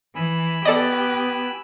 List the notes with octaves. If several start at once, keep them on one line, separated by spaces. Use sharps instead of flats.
E3 G#5 B5 E6
B3 G4 A4 D5 D#5